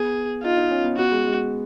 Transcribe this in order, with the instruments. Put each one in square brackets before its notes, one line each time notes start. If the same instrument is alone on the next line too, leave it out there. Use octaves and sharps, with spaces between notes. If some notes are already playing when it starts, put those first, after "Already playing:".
Already playing: [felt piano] B3 [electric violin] G#4
[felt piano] D#4 [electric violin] F4
[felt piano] D#4
C#4
B3
[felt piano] B3 [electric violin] F#4
[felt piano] G#3
G#3